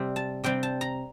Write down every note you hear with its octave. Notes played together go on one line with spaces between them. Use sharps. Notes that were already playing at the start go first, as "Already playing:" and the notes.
Already playing: C3 G3 C4
A5
C3 G3 C4 G5
A5
A#5